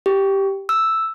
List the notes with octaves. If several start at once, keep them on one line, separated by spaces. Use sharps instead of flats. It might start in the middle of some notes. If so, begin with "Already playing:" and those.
G4
E6